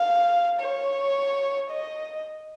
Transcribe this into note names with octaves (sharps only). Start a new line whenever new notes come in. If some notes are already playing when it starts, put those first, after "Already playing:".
Already playing: F5
C#5
D#5